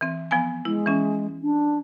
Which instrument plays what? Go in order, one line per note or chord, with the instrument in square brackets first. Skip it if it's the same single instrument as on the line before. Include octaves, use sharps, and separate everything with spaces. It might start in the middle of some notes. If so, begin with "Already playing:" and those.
[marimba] E3 C4
F3 B3 G#5
[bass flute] G#3 [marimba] E4
[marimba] E3 C#4
[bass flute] D4